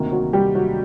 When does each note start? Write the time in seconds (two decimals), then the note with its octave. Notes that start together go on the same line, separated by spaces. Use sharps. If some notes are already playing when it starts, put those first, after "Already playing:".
Already playing: D2 C3 D#3 A#3 A#4
0.12 F#3 F#4
0.33 G3 G4
0.55 F#3 F#4